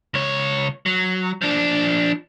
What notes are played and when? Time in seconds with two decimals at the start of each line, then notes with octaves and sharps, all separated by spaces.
0.14 C#2 C#5
0.86 F#3
1.42 F3 D4